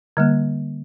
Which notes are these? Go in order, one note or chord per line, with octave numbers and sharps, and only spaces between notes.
D3 G3 A#3